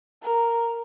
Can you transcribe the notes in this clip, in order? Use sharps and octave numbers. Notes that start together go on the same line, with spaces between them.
A#4